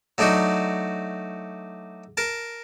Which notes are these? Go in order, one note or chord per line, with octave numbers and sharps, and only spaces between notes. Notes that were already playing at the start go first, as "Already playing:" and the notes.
F#3 A3 D4 D#4 F#4
A#4 A5